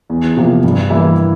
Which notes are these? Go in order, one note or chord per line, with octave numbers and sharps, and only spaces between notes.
E2
C3 F3 A#3
G2
E3 A#3 E4